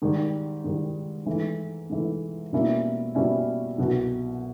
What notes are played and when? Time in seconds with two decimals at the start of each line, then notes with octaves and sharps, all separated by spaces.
0.02 G#2 D#3 G3
0.64 G#2 D#3 G3
1.26 G#2 E3 A3
1.90 G#2 E3 A3
2.53 B2 G3 A#3 C#4 E4
3.15 B2 G3 A#3 C#4 E4
3.78 C2 B2 F#3